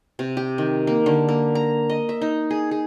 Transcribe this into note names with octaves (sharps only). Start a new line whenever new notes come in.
C3
G4
D#3
A#3
D3
A#3
A#5
D#5
E5
D#4
G#4
G#4